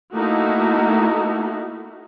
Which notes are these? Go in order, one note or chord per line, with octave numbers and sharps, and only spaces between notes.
A3 A#3 D#4 E4 F#4